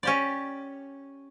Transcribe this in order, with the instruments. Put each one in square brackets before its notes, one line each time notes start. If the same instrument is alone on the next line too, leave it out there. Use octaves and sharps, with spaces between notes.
[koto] C#4 G4 D5